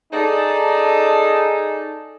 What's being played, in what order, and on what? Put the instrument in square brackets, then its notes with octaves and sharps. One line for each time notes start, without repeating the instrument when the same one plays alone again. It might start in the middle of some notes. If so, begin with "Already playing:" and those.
[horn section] D#4 G#4 [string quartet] A4 D5 A5